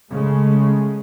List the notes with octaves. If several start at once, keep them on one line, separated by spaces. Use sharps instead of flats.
C#3 G#3 A3